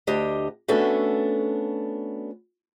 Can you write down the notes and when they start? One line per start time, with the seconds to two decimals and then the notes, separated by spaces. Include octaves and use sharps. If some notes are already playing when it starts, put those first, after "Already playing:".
0.07 D2 D4 G4 D#5
0.68 A3 B3 C#4 D4 F#4 A4